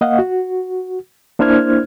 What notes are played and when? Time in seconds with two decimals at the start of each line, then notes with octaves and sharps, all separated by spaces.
0.01 A#3 D#5 F5 F#5
0.19 F#4
1.39 A#3 D4 E4 C5 F6 G#6